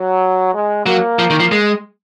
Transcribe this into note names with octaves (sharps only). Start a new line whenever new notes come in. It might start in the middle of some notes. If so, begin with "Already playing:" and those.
Already playing: F#3
G#3
F#3 A#3
F3
D#3
F3
G#3